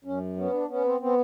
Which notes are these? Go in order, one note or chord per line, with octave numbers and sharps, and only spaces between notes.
F#2 C#4
B3 C#4
D4
B3 C#4
C4
B3 C4